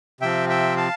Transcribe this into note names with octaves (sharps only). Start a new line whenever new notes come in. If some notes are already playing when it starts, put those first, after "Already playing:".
C3 F3 C4 E5 G5
E5 G5
F5 A5